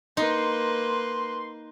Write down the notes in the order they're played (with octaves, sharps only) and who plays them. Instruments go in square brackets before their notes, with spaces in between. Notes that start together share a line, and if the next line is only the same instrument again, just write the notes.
[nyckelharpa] A#3 B4 [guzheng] D#4 [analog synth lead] C6